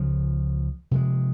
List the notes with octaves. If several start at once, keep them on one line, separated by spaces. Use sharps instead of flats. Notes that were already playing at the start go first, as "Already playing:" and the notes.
Already playing: C#2 C#3 F3
C3 F3 G#3